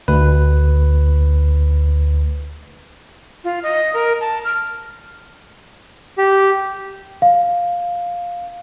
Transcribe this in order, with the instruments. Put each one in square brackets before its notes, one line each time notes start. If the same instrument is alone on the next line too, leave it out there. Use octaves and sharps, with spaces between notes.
[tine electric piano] D2 B4
[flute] F4
D#5
A#4
A5
F6
[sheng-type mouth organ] G4
[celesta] F5